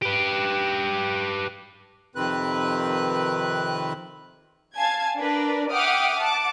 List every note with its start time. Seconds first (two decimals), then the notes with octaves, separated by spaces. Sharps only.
0.02 G4 B4
2.15 F2 C3 D#3 C4 B4 F#6
4.76 F5 G#5 A5 G#6
5.18 D4 A#4 B4 D5
5.71 E5 F#5 G5 D6 D#6 F6
6.19 F#5 A5 D6